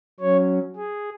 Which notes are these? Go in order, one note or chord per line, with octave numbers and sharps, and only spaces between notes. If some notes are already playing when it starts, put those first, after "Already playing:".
F#3 C#4 C#5
G#4